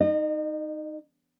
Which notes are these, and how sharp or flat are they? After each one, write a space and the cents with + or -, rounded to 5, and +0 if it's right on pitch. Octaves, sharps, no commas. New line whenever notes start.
D#4 +0 D#5 -35